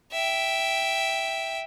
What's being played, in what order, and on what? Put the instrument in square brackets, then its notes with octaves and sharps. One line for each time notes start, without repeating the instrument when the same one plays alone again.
[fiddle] E5 G5